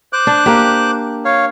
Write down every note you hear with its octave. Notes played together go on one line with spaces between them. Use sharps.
C5 D6 F#6
D4
A#3 G4
C#5 F5